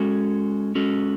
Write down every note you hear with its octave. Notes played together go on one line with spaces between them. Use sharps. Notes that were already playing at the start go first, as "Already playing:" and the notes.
Already playing: G#3 C#4 F#4 A4
G#3 C#4 F#4 A4